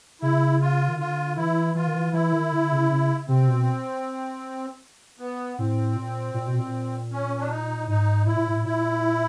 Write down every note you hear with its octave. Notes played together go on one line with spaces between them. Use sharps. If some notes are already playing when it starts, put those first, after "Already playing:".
C#3 E4
F4
D#3
D3 F4
E3 E4
E3 F4
D#3
E3
E3 E4
D#3
D3
C#3
C#3
C3 C4
B2
B3
A2 C4
A#2
A#2
B2
A#2
C#4
D4
D#4
G#2 D#4
A2 E4
A#2
A2
A#2 E4